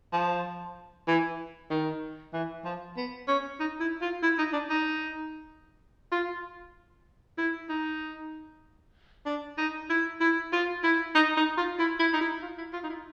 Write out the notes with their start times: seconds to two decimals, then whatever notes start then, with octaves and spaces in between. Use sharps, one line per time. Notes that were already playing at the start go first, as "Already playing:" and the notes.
0.13 F3
1.08 E3
1.70 D#3
2.33 E3
2.65 F3
2.97 B3
3.28 C#4
3.60 D#4
3.80 E4
4.02 F4
4.23 E4
4.39 D#4
4.53 D4
4.70 D#4
6.12 F4
7.38 E4
7.69 D#4
9.26 D4
9.58 D#4
9.90 E4
10.20 E4
10.53 F4
10.83 E4
11.15 D#4
11.37 D#4
11.57 F4
11.79 E4
11.99 E4
12.13 D#4
12.21 E4
12.42 F4
12.58 E4
12.73 F4
12.84 D#4
12.90 E4